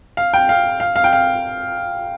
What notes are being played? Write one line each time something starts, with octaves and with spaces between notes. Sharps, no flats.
F5
G5
F5
F5
F5
G5
F5